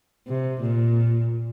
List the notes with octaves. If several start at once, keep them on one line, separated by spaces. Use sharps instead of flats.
C3
A#2